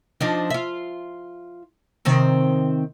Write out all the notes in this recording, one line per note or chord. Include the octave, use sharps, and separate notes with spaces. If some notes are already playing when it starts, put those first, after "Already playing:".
F3 D4 D#4
F4 E5
C3 D#3 C4